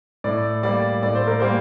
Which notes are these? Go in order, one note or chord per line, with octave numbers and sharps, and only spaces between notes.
A2 D5
G3 A#3 D5
A2 D5
C5
A#4
G3 A#3 C5